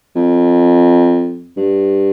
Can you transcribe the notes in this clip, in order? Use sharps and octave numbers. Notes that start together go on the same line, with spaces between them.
F2
G2